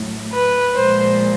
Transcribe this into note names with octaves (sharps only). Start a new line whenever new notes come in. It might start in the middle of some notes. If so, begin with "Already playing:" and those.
Already playing: A2 F#3 A3
B4
A#2 F3 G#3 C5